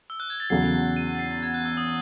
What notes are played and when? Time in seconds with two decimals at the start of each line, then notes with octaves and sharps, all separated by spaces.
0.10 E6
0.20 F#6
0.30 G#6
0.40 A6
0.50 E2 C#3 F#3 C7
0.97 D#7
1.15 A6
1.19 C7
1.31 A6
1.43 G#6
1.54 F#6
1.66 E6
1.77 D#6